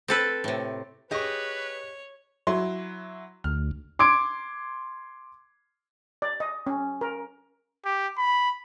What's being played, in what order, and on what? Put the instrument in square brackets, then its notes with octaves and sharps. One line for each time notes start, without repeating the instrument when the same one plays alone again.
[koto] C4 A4 B4
A2 C3
[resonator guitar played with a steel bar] G4 D#5 [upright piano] G#4 C#6 [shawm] B4 [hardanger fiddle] C#5
[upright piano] F#3 E4 C6
[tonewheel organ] D2 [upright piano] F6
[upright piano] C6 D6 G#6 D7
[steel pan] D5
D#5
C#4
A#4
[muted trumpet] G4
B5